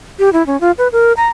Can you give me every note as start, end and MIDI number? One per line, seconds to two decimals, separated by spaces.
0.19 0.32 67
0.33 0.45 64
0.47 0.59 61
0.61 0.71 65
0.78 0.88 71
0.92 1.13 70
1.17 1.28 82